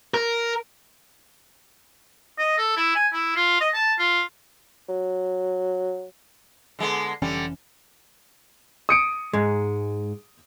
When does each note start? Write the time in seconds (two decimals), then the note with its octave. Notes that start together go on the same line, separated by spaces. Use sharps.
0.14 A#4
2.38 D#5
2.58 A4
2.77 E4
2.95 G#5
3.13 E4
3.36 F4
3.60 D#5
3.73 A5
3.99 F4
4.89 F#3
6.79 D3 G#3 B3
7.22 F1 D3 E3 G3 C#4
8.89 D#6 C#7 D7
9.33 G#2 G#3